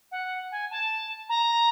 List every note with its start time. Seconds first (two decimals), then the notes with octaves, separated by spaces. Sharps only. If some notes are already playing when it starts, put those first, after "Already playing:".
0.11 F#5
0.51 G#5
0.70 A5
1.29 A#5